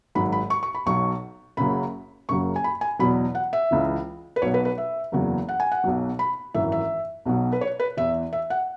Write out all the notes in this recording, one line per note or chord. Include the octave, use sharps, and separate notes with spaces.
G#1 G#2 F#3 B5
B5
C#6
C#6
B5
B1 B2 F#3 C#6
F#1 F#2 C#3 F#3 B5
F#1 F#2 C#3 F#3 C#6
G#5
B5
G#5
E2 B2 F#3 B5
F#5
E5
C#2 C#3 E3
B4
B1 B2 F#3 C#5
B4
B4
E5
F#1 E2 C#3 F#3
F#5
G#5
F#5
B1 B2 F#3
B5
G#1 F#2 E3 E5
E5
B1 B2 F#3
B4
C#5
B4
E2 E3 E5
E5
F#5